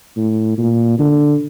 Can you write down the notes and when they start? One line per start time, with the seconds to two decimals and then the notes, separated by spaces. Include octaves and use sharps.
0.16 A2
0.58 A#2
0.99 D3